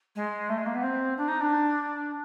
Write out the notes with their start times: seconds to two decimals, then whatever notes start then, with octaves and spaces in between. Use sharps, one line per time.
0.15 G#3
0.49 A3
0.58 G#3
0.66 A#3
0.74 B3
0.83 C4
1.17 D4
1.28 D#4
1.40 D4